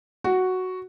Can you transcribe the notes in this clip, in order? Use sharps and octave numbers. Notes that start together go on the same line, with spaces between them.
F#4